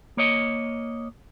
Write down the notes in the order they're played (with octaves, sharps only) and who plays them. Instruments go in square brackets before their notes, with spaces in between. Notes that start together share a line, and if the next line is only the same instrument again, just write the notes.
[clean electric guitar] A#3 C#5 D#5